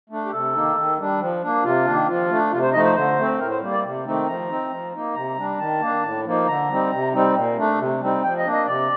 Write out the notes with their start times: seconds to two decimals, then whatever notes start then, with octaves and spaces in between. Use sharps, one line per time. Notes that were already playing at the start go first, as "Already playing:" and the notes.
0.10 A3 D4
0.26 G4
0.32 C3 A4
0.54 D#3 A#3 D#4
0.76 D#3
0.98 G3 D4
1.20 F3
1.42 A#3 D4
1.64 C3 F4
1.85 D#3 A#3 D4
2.08 F3 F4
2.30 A3 D4
2.51 C3 F4
2.62 C5
2.73 F3 A3 D#4 D#5
2.84 C5
2.95 D3 C5
3.17 A3 C4
3.39 A2 A#4
3.51 C5
3.61 G3 A#3
3.72 D5
3.83 C3
4.06 D#3 A3 C4 D#4
4.27 F3 A#5
4.49 C4 D#4
4.71 F3
4.93 A#3 D#4
5.15 C3 A#5
5.37 G3 D4
5.59 D#3 A5
5.81 A#3 D4
6.03 A2
6.24 F3 A#3 D#4
6.47 D3 A#5
6.69 G3 C4 D#4
6.91 C3
7.13 G3 C4 D#4
7.35 A#2
7.57 A3 D4
7.79 C3
8.01 G3 C4 D#4
8.23 F3 G5
8.38 D#5
8.44 A#3 D4
8.52 D#5
8.66 C3 D5